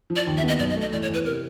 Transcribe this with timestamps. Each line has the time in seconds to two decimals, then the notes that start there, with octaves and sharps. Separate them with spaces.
0.10 F3
0.16 D5
0.27 D#2
0.37 E5
0.43 B3 D#5
0.59 B1 D5
0.70 D#5
0.76 A3
0.81 D#5
0.92 E2 D5
1.02 C#5
1.08 E2
1.14 B4
1.25 C3 A#4